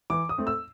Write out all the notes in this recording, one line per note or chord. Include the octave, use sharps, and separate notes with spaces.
E3 D6
D#6
A3 C4
E6